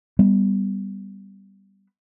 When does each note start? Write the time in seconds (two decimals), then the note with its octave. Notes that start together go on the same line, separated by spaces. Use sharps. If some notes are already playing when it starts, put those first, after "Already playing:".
0.19 G3 B3